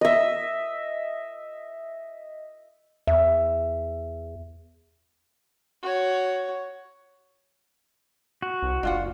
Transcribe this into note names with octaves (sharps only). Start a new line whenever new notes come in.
D#5 E5
E2 E5
F#4 C#5
F#4
C2
F#1 D4 F4 F#5